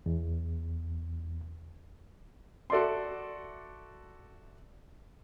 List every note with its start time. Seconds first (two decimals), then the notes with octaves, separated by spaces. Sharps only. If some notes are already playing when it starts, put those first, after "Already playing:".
0.06 E2
2.70 F#4 A4 D5 E5 C6